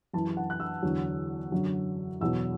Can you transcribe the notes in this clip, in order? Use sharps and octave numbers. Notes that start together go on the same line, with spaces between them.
F#2 E3 A5
F#5
F#6
E6
E2 D3 F#3
F#2 D3 F#3
E2 B2 F#3 E6